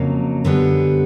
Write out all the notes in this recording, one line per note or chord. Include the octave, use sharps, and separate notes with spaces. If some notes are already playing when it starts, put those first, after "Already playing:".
Already playing: F2 C#3 F#3 A#3
F#2 D3 G3 B3